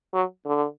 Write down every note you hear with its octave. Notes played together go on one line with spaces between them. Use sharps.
F#3
D3